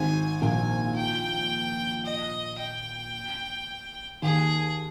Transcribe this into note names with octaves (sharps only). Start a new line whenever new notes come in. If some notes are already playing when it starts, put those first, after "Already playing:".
Already playing: G#1 G#2 G#5
A#1 A#2 G#5
G5
D#5
G5
D#2 D#3 G#4